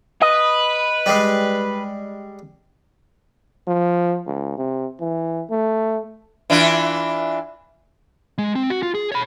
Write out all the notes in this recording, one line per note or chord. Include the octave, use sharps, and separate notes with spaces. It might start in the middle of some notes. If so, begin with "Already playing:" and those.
B4 D#5
G3 G#3
F3
C#2
C3
E3
A3
E3 D4 F4
G#3
C4
F#4
F4
G#4
C#5 B5